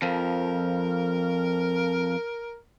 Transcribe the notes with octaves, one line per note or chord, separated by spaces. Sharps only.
F2 F3 A#4